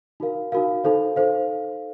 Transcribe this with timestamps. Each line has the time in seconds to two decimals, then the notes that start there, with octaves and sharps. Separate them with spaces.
0.20 D#4 F#4 A#4 F5
0.52 D#4 F#4 A#4 F5
0.84 D#4 A4 C5 F5
1.16 D#4 A4 C5 F5